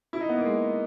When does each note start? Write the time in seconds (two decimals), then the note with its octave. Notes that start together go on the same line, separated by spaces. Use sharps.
0.13 E4
0.21 D#4
0.29 B3
0.37 A#3
0.45 G#3